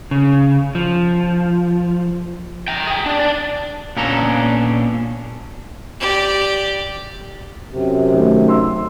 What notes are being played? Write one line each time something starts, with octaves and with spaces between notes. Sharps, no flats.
C#3
F3
G5 A#5
G#4 G5
D4
D5 A5
A#2 B3 C#4 D4 A4 A#5
G4 D5
F#2 C3
D#3 A3
C6 E6